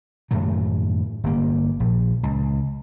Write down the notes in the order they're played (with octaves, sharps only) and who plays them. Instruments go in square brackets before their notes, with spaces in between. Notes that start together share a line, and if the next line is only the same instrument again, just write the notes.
[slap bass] F#2 A2 D#3 F#3
G1 A#3
A#1
C#2